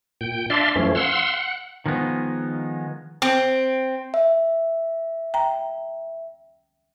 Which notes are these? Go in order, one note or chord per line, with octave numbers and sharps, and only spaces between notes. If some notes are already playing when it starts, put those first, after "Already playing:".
A#2 G5
D4 D5 E5 F5 C6
F#2 E3 F3 A3 C#4
F5 F#5 C6 E6
F#5
D#3 F3 G#3 B3 D#4
C4
E5
G5 A#5